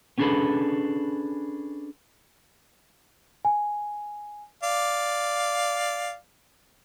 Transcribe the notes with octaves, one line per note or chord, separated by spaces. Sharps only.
B3 C#4 D4 G#4 A4 B4
G#5
D5 F5